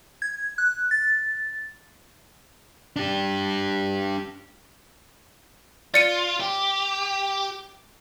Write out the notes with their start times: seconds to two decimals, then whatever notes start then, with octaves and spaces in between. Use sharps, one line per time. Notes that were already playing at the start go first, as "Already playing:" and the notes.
0.22 G#6
0.58 F#6
0.91 A6
2.96 D4 G4
5.94 F4 D5 C#7 D#7
6.40 G4